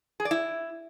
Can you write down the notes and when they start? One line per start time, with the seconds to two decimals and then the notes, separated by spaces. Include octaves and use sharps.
0.20 G#4
0.25 D5
0.31 E4